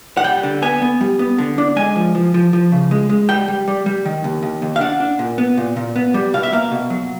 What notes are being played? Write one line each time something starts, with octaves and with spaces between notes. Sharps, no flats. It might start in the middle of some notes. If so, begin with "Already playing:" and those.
F#5
G3 G5
D3
B3 G#5
B3
G3
B3
D3
D4
G#3 G#5
F3
F3
F3
F3
C#3
G#3
G#3
G3 G5
G3
G3
G3
D#3
D#2
D#2
D#2
F5
D4 F#5
D4
A#2
B3
A#2
A#2
B3
G3
B2 F5
E5
A#3 F5
B2
F#3